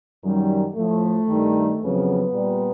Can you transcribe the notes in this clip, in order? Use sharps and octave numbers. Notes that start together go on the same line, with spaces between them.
F#2 D#3 G3
A2 F3 A3
G2 D#3 G3
F2 C#3 F#3 B3
A#2 G3